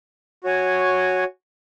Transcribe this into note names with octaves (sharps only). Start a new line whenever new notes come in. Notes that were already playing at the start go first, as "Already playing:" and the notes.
F#4 C#5 G#5